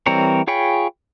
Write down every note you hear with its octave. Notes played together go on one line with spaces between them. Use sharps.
E3 G3 C4 A#4 C#5
F4 G#4 C#5 G5 B5